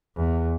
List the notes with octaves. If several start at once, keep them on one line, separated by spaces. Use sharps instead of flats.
E2